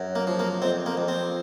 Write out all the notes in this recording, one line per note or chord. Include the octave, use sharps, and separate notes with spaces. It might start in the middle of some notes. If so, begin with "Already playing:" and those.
Already playing: F#2
A#3
F3
A#3
F2 C4
A#3
F2
C4